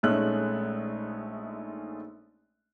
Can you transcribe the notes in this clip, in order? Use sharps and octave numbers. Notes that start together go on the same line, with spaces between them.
A#1 G#3 A3 C#4 D#4 F#6